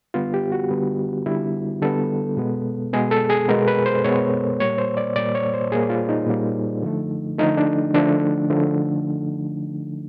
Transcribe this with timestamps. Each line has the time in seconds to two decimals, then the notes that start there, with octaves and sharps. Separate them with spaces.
0.14 D3 G3 B3 F4
0.34 G4
0.52 F#4
0.70 D3 G3 B3
1.26 D3 G3 B3 E4
1.82 D3 G3 B3 A4
2.37 B2 G#3 B3
2.93 B2 G#3 B3 G#4
3.11 A4
3.30 G#4
3.48 B2 G#3 B3 A#4
3.68 B4
3.86 C5
4.04 B2 G#3 B3 C#5
4.60 A#2 G3 A#3 C#5
4.78 C5
4.97 D5
5.16 A#2 G3 A#3 D5
5.35 C#5
5.54 C5
5.72 A#2 G3 A#3 G#4
5.90 F4
6.09 D#4
6.27 A#2 G3 A#3
6.82 D3 F3 A3
7.39 D3 F3 A3 D#4
7.57 D4
7.94 D3 F3 A3 D4
8.50 D3 F3 A3